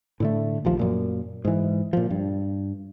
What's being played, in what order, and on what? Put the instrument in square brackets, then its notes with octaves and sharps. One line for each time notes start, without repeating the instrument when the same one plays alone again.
[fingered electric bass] A2 D3 A3
A#1 D#2 F3
F#2 A#2
G#2 E3
A#2 F3
G2